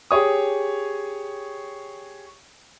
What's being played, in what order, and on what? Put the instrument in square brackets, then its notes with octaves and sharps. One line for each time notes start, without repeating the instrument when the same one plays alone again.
[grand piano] G4 G#4 C#5 D#6